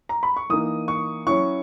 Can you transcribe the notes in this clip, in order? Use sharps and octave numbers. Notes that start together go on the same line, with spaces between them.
A#5
B5
C#6
E3 A#3 D#4 D#6
C#6
F#3 C#4 E4 C#6